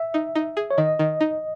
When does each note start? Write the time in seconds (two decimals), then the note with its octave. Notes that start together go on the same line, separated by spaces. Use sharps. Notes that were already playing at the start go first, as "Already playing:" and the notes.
Already playing: E5
0.14 D#4
0.35 D#4
0.57 G#4
0.71 C#5
0.78 D#3 D#5
0.99 D#3
1.21 D#4